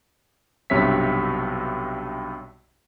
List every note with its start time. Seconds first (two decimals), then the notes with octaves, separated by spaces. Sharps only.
0.70 B1 G2 C3 C#5 E5 B6